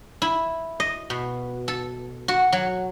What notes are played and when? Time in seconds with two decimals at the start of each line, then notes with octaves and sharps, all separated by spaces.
0.22 E4
0.80 D#5
1.10 B2
1.68 A4
2.28 F#4
2.52 F#3